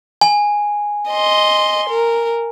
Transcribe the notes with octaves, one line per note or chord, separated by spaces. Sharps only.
G#5
D#5 C6
A#4